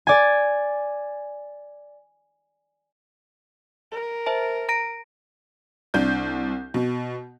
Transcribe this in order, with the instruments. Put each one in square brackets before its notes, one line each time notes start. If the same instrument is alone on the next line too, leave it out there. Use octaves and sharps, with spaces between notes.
[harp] D5 G#5
[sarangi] A#4
[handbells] C5 E5 A5
A#5 A#6 D7
[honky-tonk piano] C2 D4 G6
B2